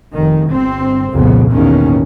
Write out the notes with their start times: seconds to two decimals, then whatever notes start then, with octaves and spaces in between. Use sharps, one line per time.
0.14 F1 D#3
0.50 G1 C4
1.12 C2 F2 A#2 C#3 F3 B3
1.51 A1 E2 B2 D#3 A#3 C#4